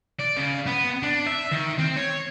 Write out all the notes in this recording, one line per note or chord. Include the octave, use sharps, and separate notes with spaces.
D5
C#3
B3
D4
E5
D#3
C4
C#5